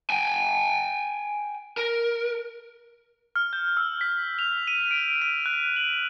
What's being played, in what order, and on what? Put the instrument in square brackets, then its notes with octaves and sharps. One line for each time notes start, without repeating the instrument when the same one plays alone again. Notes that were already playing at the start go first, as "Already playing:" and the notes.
[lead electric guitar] G5 G#5
A#4
[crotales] F6
G6
E6
B6
F7
D#7
D7
D#7
F#6
F#7